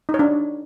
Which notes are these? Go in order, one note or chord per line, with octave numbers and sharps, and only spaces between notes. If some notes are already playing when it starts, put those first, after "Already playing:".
D#4
C#5
D4